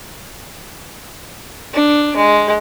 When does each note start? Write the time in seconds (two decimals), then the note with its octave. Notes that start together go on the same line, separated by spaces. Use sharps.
1.74 D4
2.16 G#3